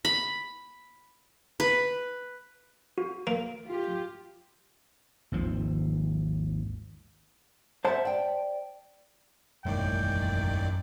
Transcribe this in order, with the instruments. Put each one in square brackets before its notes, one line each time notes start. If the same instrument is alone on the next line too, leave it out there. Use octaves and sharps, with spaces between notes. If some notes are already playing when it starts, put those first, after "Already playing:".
[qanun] B5
B4
[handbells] F#4
[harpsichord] A#3
[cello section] F4 G4
[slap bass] G#1 D#2 F3
[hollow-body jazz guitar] C5 A5 [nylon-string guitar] E5 F#5
[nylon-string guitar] D5 G5
[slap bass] E1 G#3 A#3 [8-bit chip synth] A1 D#3 D5 [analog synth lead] F#2 [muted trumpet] G5